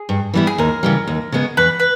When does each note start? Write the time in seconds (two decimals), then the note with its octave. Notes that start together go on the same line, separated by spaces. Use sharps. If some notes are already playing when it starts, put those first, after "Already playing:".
Already playing: G#4
0.09 G2
0.34 E3 G3 B3 E4
0.47 G#4
0.58 D#2 A#4
0.83 C#3 E3 G3
1.07 D#2
1.32 C#3 G#3 B3
1.57 E2 B4
1.80 B4